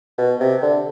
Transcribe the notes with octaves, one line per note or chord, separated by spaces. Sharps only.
B2
C3
D3